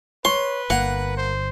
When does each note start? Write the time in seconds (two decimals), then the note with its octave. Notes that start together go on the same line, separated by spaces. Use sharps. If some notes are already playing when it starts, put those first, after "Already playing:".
0.25 B4 C#5 C6
0.70 G1 A#3 F#5
1.17 C5